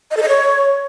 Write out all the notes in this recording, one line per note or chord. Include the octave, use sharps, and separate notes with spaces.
D#5
A4
D#5
C#5